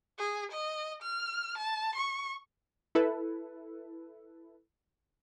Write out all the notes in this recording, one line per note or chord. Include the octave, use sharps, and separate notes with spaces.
G#4
D#5
F6
A5
C#6
E4 A4 B4